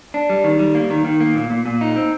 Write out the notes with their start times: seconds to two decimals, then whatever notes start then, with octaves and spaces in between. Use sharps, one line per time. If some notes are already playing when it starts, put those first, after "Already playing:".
0.14 D4
0.30 G3
0.44 D#3
0.59 G3
0.75 A#3
0.90 D#3
1.05 D#3
1.20 A#3
1.35 A#2
1.50 A#2
1.66 A#2
1.81 D#4
1.96 C4